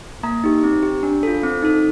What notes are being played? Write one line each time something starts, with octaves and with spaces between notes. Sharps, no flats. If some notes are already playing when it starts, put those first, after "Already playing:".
A#3 A#5
D#4 G4
C4
G4
D4
F4 A4
C4
D#4 A4